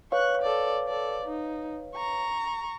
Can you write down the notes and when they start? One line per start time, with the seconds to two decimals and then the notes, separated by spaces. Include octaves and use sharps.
0.12 B4 C#5 F5 C#6 F#6
0.42 A4 D5
0.87 A4 D5
1.26 D#4
1.95 A#5 C#6